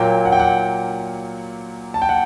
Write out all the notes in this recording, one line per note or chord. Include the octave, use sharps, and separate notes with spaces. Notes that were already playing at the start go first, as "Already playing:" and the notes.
Already playing: A#2 F#3 A#3 G5
F#5
G5
F#5
A5
G5
F#5